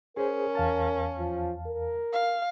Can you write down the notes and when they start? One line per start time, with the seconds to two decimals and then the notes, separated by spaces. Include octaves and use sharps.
0.17 C#4 G#4 A#4 C5
0.55 E2 F5 A5
1.18 F3
1.67 A#4
2.13 F5